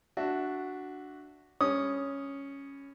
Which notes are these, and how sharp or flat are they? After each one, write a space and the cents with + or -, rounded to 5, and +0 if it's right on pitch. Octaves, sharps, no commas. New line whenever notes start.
D4 +0 F#4 +0 E5 +0
G3 +25 C#4 +0 D#6 -5